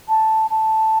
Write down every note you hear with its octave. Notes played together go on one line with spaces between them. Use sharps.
A5
A5